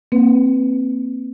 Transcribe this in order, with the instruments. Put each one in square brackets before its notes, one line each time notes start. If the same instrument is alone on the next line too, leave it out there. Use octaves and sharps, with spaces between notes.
[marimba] A#3 C4 B4